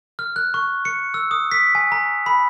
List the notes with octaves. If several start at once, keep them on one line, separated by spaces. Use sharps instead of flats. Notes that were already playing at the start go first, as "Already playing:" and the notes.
F6
F#6
C#6
C#7
E6
D#6
B6
G#5
A#5
B5